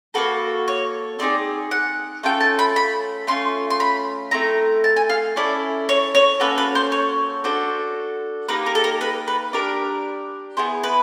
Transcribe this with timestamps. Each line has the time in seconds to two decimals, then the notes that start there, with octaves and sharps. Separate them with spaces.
0.14 A#3 D4 F#4 A4 B4
0.68 C#5
1.19 A3 C4 D#4 G#4 D5
1.71 F#5
2.23 A3 C#4 F4 A4 G5
2.40 A5
2.59 B5
2.76 B5
3.27 A3 C#4 F4 C6
3.70 C6
3.80 B5
4.31 A3 C4 E4 A#5
4.84 A5
4.96 G#5
5.10 F5
5.36 C#4 E4 A4 D5
5.89 C#5
6.15 C#5
6.40 A#3 C#4 F#4 A4 B4
6.58 B4
6.75 C5
6.92 C#5
7.44 D4 F#4 A4 C5
8.49 A#3 D#4 G4 B4
8.66 A#4
8.75 A4
8.84 A#4
9.01 B4
9.28 B4
9.53 D4 G4 A#4
10.57 B3 E4 G#4 C5
10.84 B4